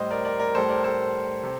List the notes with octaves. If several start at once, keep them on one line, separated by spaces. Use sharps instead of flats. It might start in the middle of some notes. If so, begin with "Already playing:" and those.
Already playing: A2 G3 C5 D5 D#5
A#4 D5
A#4 D5
A#4 D5
A2 G3 A4 C5
A#4 D5
A4 C5
C3